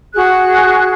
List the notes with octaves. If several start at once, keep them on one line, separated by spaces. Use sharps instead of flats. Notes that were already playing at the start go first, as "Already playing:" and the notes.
F#4 G#4 F#6